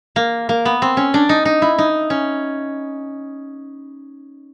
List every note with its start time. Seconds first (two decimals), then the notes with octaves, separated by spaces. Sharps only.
0.16 A#3
0.49 A#3
0.65 B3
0.82 C4
0.97 C#4
1.14 D4
1.29 D#4
1.45 D#4
1.62 E4
1.78 D#4
2.10 C#4